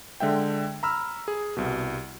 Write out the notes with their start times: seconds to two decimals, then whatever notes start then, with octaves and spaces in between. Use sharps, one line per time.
0.20 D3 G#3 E5 G5
0.83 A#5 B5 E6 F6
1.28 G#4
1.57 C2 B2